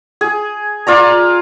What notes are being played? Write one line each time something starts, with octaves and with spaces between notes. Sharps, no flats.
G#4
F4 D5 A#5